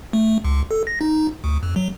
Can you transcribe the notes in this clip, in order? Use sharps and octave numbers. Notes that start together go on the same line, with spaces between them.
A3
C#2
A4
A#6
D#4
D2
F2
F#3